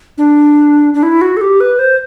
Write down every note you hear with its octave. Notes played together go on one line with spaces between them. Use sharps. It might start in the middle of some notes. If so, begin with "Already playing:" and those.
D4
D4
E4
F#4
A4
G4
B4
C5